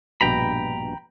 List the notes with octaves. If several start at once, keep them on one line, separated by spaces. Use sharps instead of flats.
A#1 G2 B2 G5 A#5 B5